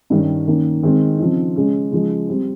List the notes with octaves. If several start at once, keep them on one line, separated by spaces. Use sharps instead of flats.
G2 D#3 G3 C#4
D#3 A#3 C#4
D#3 G#3 C4
C#3 F3 C4 D#4
C#3 G#3 C#4
C#3 F3 G#3
G3 C4